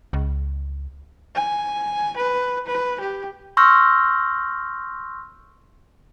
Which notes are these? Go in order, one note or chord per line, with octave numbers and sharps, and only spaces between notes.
C#2
G#5
B4
B4
G4
C6 C#6 E6 F6 G6 A#6